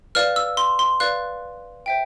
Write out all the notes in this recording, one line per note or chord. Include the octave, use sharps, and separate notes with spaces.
B4 D5 F5 F6
E6
C6
C6
B4 D5 F5 F#6
C5 E5 G5